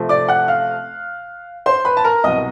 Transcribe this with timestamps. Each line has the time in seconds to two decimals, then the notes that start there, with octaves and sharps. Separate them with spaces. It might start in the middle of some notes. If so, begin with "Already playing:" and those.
Already playing: C3 F3 A3 C4
0.09 D5 D6
0.29 F#5 F#6
0.48 F5 F6
1.66 C5 C6
1.85 B4 B5
1.97 A5
2.04 A#4 A#5
2.24 C2 B2 F#3 D#5 D#6